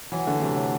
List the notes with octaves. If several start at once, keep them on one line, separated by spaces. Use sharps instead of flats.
E3 F#3
D3 A3
C3 F#3
F#3